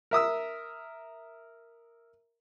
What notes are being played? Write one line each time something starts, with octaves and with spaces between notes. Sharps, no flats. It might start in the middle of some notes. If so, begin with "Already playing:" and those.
A#4 E5 D#6 E6